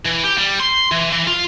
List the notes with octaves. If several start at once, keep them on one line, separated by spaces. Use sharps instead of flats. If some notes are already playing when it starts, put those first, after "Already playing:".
E3
G4
G3
C6
E3
E3
F4